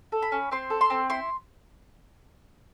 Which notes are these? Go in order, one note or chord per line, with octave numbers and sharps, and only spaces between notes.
A4
B5
C#4
C4 C6
A4
C6
C4
E4 C6